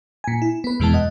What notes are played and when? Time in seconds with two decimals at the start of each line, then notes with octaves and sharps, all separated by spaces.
0.24 A#2 G#5
0.42 E4
0.64 B3 B4
0.80 E2 B2 E3 G#3 B3 A5
0.92 F#2 D#5 F#5